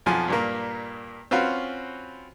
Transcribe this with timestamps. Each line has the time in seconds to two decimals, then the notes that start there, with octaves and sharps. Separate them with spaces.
0.06 B1 F2 F3 G#5 C6
0.28 G2 A#2 A#3
1.31 C4 C#4 F4 F#4 B4